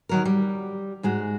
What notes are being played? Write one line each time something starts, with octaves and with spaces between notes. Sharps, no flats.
D#3 F#3 A#4
G3
G#2 G#3 F#4